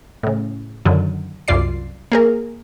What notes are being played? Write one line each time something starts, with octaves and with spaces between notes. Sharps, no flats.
A2 C#3
F#2 D3 D#3 F#3
C2 F#2 F4 D5 C7
A#3 G#4 A#4